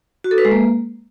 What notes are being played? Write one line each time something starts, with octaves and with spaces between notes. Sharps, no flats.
F#4
A4
B4
G#3
A#3